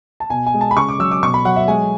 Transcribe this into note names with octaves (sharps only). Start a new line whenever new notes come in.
A5
B2 G#5
G#5
G#3
A5
B5
C#3 C#6
D6
F#3 E6
D6
B2 C#6
B5
F#3 F#5
E5
G#3 G#5